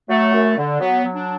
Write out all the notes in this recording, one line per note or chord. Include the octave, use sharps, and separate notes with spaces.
F#3 A3
F#2
D3
F#3 B3
F#3
D4